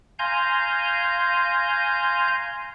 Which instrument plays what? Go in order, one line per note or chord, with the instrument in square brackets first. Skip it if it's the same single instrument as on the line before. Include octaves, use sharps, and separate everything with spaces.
[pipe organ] F5 G#5 A#5 C6 G6